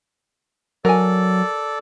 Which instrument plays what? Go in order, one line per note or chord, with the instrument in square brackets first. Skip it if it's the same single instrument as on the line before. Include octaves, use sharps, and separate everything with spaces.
[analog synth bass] F#3 [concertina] A4 D5 [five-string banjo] A#4 G#5